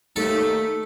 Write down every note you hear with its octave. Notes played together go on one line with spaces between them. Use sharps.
D#2 A3 D#4 A4